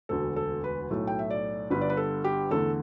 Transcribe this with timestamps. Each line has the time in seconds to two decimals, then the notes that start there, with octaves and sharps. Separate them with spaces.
0.09 E1 D2 D3 A4
0.36 A4
0.64 B4
0.90 B1 A2 A3
1.07 G5
1.19 E5
1.30 D5
1.70 G1 G2 D3 B4
1.81 D5
1.90 B4
1.97 A4
2.24 G4
2.51 E2 D3 A3 A4